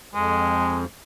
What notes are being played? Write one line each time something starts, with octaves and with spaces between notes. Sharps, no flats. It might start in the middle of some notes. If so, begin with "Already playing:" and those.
F2 G#3